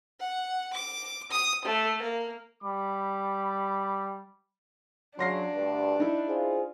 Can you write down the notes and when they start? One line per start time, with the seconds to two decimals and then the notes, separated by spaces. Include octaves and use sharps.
0.20 F#5
0.74 D6
1.31 D#6
1.65 A3
2.02 A#3
2.62 G3 B5 D6
5.19 C#3 F#3 D4 C6 A#6 C7
5.54 D2 G2
6.00 D#4 E4
6.28 F4 G#4 C5